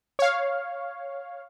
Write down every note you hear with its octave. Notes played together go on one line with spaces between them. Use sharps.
C#5 F5